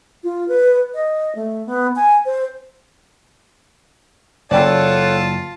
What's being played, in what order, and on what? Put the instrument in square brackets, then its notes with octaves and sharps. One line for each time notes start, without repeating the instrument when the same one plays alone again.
[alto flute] F4
B4
D#5
A3
B3
G#5
C5
[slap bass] F#1 [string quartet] F4 A5 [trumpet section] A4 C#5 F#5 [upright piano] D5 G5